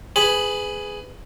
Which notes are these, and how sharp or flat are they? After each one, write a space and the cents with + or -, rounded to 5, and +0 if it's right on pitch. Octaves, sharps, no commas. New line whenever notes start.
G#4 +0 B4 +25 B5 +0